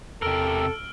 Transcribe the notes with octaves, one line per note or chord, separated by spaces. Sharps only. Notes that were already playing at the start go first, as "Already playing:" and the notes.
E2 C3 A4 A#4 E6 F6 D7